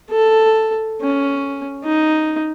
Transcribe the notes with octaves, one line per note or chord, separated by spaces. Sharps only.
A4
C#4
D#4